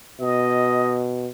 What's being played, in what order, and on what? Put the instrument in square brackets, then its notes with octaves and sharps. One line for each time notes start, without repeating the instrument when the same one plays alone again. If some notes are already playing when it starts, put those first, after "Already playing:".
[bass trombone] B2 [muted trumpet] D#5